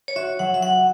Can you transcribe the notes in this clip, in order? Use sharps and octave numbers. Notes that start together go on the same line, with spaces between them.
C#5
F#4 E5
F#3 F#5
E5
F#4 F#5